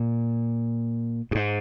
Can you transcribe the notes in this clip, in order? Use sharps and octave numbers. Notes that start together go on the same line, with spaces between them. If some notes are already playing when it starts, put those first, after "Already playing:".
Already playing: A#2
G2
G#2